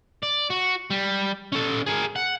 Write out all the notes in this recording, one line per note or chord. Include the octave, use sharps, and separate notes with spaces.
D5
F#4
G3
C#4 A4
G#4 A#4
F#5